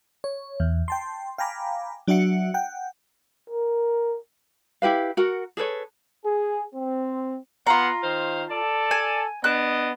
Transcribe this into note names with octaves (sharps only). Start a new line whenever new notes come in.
C#5
E2
G5 A5 C6
F5 G5 G#5 A#5 B5 D6
F#3 D4 F#4 E5 F#5 C#7
F#5 G5
A#4
E4 G4 B4 F5
F#4 A#4 F#5
G#4 A4 B4 C#5
G#4
C4
B3 F4 F5 F#5 A#5
D#3 C5 F5
A4 D5 A5
G#5
B3 D4 D#5 F#6